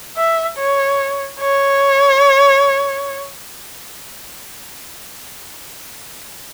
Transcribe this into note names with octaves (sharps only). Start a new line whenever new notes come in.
E5
C#5
C#5